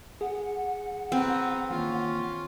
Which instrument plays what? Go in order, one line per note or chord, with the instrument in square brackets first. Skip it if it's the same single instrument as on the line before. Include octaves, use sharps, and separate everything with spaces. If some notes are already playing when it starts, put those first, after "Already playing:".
[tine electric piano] G#4 [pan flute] F#5
[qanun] C4 [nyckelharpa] B4 A#5
[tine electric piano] D#3 E3 A#3 [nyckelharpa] C#4 F4